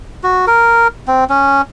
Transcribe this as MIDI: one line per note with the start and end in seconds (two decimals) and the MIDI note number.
0.23 0.45 66
0.47 0.88 70
1.08 1.24 60
1.29 1.62 61